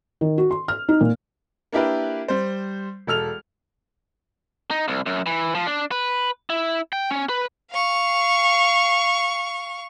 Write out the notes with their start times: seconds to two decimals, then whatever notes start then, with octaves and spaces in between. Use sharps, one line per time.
0.21 D#3
0.38 F#4
0.51 C6
0.68 F6
0.89 D#4
1.01 A#2
1.73 A#3 D4 E4 G4 A#4 B4
2.28 G3 C5
3.07 E1 A4 F6 F7
4.71 D#4
4.88 C2
5.06 F#2
5.26 E3
5.55 F3
5.67 D4
5.91 B4
6.50 E4
6.93 G5
7.11 C#4
7.29 B4
7.71 F5 C#6